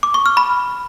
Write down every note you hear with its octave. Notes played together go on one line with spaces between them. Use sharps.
D6
C#6
F6
B5